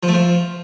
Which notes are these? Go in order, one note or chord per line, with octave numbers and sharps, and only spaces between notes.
F3
A3
F3